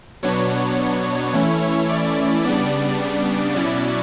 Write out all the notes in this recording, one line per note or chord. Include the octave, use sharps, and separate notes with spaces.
B2 F#3 B3 D4 C#5
E3 A3 C#4 E4
D5
C#3 G3 B3 D4 D5
B2 F#3 C#4 E4 D5